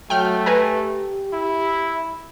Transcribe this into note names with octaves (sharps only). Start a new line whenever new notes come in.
F#3 A3 G5 F6
G4 B4 G#5 A#5
E4